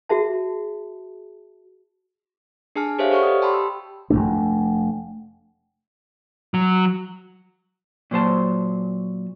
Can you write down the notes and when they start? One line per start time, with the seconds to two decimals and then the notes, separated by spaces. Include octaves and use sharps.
0.09 F#4 G#4 E5 A5
2.76 D4 G#4 G#5 A5 F6
2.99 G4 A4 C5 C#5 E5 F5
3.10 G4 C#5 D5 F#5 C#6 F6
3.23 G4 D#6
3.42 G5 A5 B5 C6
3.54 E6
4.10 F1 G#2 A3 D4
6.54 F#3
8.11 A#2 F#3 C5 A5